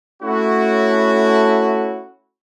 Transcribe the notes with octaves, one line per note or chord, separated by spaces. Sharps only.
A3 C#4 E4 F#4